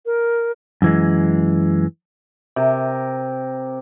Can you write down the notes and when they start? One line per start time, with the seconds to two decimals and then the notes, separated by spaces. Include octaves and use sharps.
0.06 A#4
0.82 F#2 E3 G#3
2.56 C3 A#4